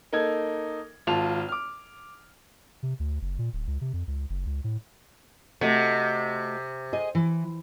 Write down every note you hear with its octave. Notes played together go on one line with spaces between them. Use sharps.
A#3 D#4 A4 G#6
G#1 F4 A5 F6 F7
D6 F6
C3
D2
F#1
A#2
D1
C#2
C3
F2
C#2
F#1
C#2
A2
C3 A3 F#4 D#5
G#4 D#5
E3